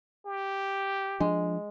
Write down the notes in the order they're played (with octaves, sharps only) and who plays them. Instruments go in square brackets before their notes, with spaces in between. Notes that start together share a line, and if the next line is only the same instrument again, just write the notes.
[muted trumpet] G4
[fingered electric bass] F3 D4 [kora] G#3